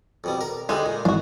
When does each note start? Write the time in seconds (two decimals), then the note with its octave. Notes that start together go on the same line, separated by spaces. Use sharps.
0.24 F2 B2 G3
0.41 A#4
0.69 D2 D3 G3 G#3 D#4
0.86 A#2
1.05 G#1 E3 D4 F#4